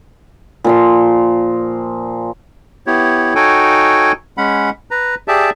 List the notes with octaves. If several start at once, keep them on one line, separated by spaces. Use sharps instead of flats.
A#2 F3 C6
B3 E4 G4 C#5
D#4 F#4 A4 C#5 G5 G#5
G#3 C#4 F#5 B5
B4 A#5
G4 G#4 D5 E5 A5